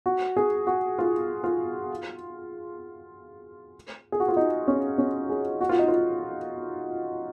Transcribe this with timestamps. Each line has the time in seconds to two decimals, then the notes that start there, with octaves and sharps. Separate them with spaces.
0.06 F#4
0.37 G#4
0.67 F#4
0.99 F4
1.44 F4
4.12 G#4
4.20 F#4
4.28 F4
4.37 D#4
4.68 C#4
4.98 C#4
5.30 G#4
5.61 F#4
5.69 F4
5.79 D#4
5.88 F4